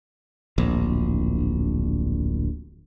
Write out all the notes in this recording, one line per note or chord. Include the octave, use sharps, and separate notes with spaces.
D1 A#1